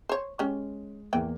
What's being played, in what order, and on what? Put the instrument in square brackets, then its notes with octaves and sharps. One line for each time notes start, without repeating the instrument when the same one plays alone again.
[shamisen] C5 C#5
[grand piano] G#3 [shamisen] C#4 G4
[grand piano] E2 A#3 [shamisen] E3 G5